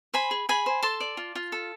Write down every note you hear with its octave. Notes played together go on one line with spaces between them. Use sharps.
C5 G#5 B5
G#4
G#4 G#5 B5
C5
A4 A5 C6
D5
F4
F4
A4